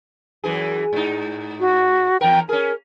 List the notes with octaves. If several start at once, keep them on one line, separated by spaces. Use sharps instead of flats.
F#2 E3 G#4
G#2 D#4
F#4
E2 A#4 G5
C#4 G#4 A#4